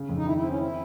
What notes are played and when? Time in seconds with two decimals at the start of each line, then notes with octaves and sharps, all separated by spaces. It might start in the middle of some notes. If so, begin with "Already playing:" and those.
Already playing: C#3
0.09 F2
0.17 D#4
0.26 D#3 E4
0.38 E4
0.43 C4
0.49 C#4
0.60 C4 E4